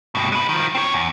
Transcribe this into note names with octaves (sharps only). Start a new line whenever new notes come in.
G2 B2
G#3 B4
D#3 F3
C4 C#5
E2